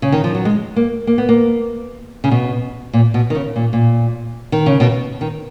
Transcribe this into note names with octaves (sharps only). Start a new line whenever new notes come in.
C#3
D#3
F3
F#3
G#3
A#3
A#3
B3
A#3
C#3
B2
A#2
B2
D#3
C#3
A#2
A#2
D#3
C#3
B2
D#3